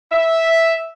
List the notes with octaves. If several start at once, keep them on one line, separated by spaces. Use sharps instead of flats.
E5